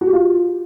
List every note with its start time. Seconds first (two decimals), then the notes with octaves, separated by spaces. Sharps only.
0.01 F#4
0.07 G4
0.13 F4